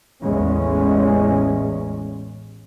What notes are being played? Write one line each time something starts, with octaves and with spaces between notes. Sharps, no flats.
A1 E2 G#3 C#4